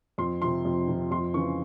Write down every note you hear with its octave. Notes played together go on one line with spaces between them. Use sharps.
F2 C6
C3 F3 C6
F2
C3 F3
F2 C6
C#3 E3 C#6